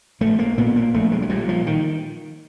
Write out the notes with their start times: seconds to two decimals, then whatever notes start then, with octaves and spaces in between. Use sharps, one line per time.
0.21 A#1 A3
0.39 A#3
0.58 A#2 B3
0.76 A#3
0.94 A#1 A3
1.12 G#3
1.22 F#3
1.29 A#2 G3
1.49 F3
1.67 D#3